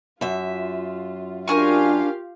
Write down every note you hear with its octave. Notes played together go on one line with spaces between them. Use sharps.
F#2 F4 E5
D4 F4 G4 A#4 F5 G#5 C#6